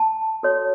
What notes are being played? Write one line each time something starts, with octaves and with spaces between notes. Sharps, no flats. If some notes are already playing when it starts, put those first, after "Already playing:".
Already playing: A5
F#4 A4 C#5